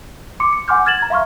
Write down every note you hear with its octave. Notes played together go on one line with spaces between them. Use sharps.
C6 D6 C#7
C#7
F#5 G#5 C6 D6 F6 G6
F6 G#6 A6 E7 F#7
A#5 G#6
E5 F5 C6 C#6 F6